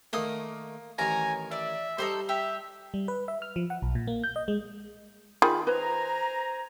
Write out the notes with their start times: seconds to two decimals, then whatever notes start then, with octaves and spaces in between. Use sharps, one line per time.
0.13 D#3 A3 A#3 D#6
0.98 A1 D#3 A#4 C#5 G#5 A#5
1.51 D5 E5
1.98 G3 D#4 A4 C5
2.29 G4 E5
2.94 G3
3.08 B4
3.28 E5
3.42 F6
3.56 F3
3.70 F#5
3.82 B1
3.95 A#2
4.07 A#3
4.24 G6
4.36 D#5
4.48 G#3
5.42 D#3 F4 G#4 B5
5.67 B4 C5 G#5 A#5